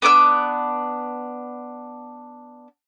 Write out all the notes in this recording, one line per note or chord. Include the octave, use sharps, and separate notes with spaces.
B3 D4 D6 E6